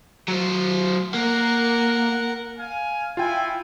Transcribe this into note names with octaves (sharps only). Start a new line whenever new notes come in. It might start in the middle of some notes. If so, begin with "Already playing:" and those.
F#3 C5
A#3 A#4 F#5
F5 G#5
E4 F4 G5 G#5